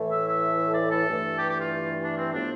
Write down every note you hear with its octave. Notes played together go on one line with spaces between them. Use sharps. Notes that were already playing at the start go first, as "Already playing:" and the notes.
Already playing: A2 E3 A3
E5
E5
D5
A4
G2 E3 A3
G4
G4
F4
D4
C4
A2 F3 B3 D4